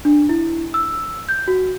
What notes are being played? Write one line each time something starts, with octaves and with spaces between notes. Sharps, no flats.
D4
E4
E6
G6
F#4